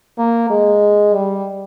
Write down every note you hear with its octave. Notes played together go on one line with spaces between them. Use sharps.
A#3
G#3
G3